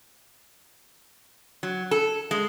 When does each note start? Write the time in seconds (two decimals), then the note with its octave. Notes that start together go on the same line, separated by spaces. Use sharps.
1.63 F#3
1.91 A4
2.31 G#3